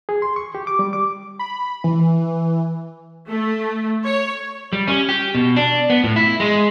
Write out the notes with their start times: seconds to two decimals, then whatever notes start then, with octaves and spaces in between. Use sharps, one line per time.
0.09 G#4
0.22 C6
0.36 C#6
0.55 G4
0.67 D6
0.79 G3
0.93 D6
1.39 B5
1.84 E3
3.28 A3
4.04 C#5
4.73 G3
4.88 C#4
5.09 G4
5.35 B2
5.56 D4
5.90 B3
6.04 A2
6.16 E4
6.40 G#3